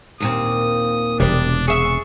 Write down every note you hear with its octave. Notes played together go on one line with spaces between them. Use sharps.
D#2 A#2 C4 D#6
E1 C3 G3 D4
G#4 E5 C#6